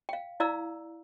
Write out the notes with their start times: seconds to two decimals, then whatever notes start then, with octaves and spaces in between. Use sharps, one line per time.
0.09 F5 G5
0.40 E4 D5 F5 A#5 E6